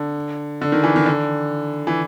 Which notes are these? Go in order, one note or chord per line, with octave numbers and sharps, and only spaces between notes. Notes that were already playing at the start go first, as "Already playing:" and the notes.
Already playing: D3
D3
D#3
E3
D#3
D3
E3